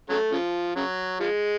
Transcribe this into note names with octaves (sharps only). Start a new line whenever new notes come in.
C#3 F#3 A3
C#3 F3
C#3 F#3
F3 G#3